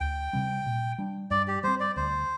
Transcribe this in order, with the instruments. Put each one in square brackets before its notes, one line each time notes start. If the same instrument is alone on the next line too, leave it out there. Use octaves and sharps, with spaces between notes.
[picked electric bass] D2 [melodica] G5
[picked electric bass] C3 G3 C4
A#2
G3 D4
[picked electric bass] G2 [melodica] D5
[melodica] G4
[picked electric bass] G3 C4 [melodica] C5
[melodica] D5
[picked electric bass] D2 [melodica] C5